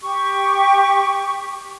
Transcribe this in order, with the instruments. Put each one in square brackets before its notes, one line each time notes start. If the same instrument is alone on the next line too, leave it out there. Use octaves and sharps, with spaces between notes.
[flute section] G4 C#6